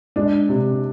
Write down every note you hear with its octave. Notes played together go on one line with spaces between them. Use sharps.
G#3 D4
C3